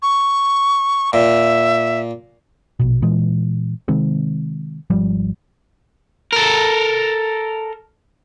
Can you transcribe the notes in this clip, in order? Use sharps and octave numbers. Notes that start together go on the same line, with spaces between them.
C#6
A#2 E5
A#1 B2
A#2 E3 G#3
C3 D#3 G#3 C4
G#1 F3 G3
A4 A#4